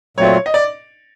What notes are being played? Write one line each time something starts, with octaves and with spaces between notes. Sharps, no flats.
A#2 F#3 A3 C4 F4 C#5
D#5
D5